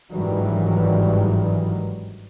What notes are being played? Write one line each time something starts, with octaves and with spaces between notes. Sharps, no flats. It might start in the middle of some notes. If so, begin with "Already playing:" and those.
G1 G#2 D#3 E3 F#3 G3